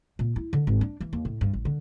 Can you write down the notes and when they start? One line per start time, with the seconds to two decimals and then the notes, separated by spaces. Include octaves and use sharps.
0.19 A#2
0.36 E4
0.53 D3
0.67 G#1
0.81 D4
1.01 E3
1.13 D#2
1.25 A2
1.41 G2
1.53 A1
1.65 D3